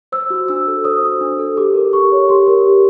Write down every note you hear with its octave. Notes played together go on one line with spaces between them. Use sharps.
C5 E6
F#4
D4 E6
A4
C5 D#6
F#4
D4
A4
G4 D6
A#4
G4 C#6
C#5
G4 C6
A#4
G4